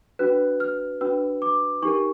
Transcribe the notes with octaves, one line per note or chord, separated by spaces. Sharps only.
D4 F#4 B4 F#6
F6
D4 F#4 B4 E6
D6
D#4 G4 A#4 C#6